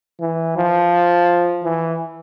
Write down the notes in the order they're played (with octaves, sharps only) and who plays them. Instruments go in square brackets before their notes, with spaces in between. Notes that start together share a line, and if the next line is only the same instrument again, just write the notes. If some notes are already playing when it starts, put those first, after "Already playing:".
[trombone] E3
F3
E3